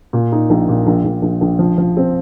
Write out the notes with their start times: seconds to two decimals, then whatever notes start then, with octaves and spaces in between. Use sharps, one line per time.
0.13 A#2
0.32 D#4
0.50 A#1
0.69 A#2
0.87 A#1
1.05 A#1
1.22 A#1
1.41 A#1
1.59 F3
1.78 F3
1.97 C4